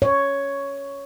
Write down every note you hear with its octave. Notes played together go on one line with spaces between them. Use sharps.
C#5